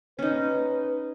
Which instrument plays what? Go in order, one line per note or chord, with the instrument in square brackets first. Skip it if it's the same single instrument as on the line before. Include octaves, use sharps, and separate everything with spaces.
[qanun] C#4 D#4 [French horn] B4